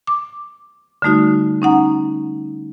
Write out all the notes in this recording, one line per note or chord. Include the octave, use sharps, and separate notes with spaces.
D6
D3 G3 A3 D#4 F#4
C#4 D#4 F#5 A#5